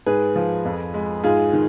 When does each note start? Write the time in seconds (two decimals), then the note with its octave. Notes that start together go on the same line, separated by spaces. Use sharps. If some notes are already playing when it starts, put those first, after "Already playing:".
0.06 G#2 G#4 B4
0.36 F3
0.65 F2
0.94 G#3
1.24 G#2 F4 G#4
1.53 D#3